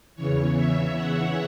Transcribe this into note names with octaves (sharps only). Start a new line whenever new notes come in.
E2 C#3 E3 C#5
E5
F#5